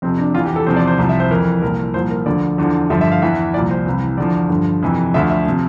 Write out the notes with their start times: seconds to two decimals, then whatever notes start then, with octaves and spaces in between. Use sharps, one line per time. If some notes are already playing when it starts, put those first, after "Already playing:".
0.02 F2 C3 F3 C4
0.18 D4
0.34 E2 F4
0.39 E3
0.45 G4
0.56 A4
0.67 E2 C3 F3 C5
0.76 D5
0.87 C5
0.98 C2 C3 F3
1.09 E5
1.20 C5
1.30 F2 E3 A#4
1.62 C2 A#2 F3 A#4
1.94 C2 A#2 F3 C5
2.10 A#4
2.26 D2 D3 F3 D5
2.58 E2 D3 F3
2.90 G2 D3 F3 E5
3.01 E5
3.12 F5
3.22 E2 E3 E5
3.54 C2 A#2 F3 D5
3.71 C5
3.86 C2 C3 E3
4.18 E2 D3 F3 D5
4.50 G2 D3 F3
4.83 F2 C3 E3
5.14 D2 D3 F3 E5
5.30 E5
5.46 C3 F3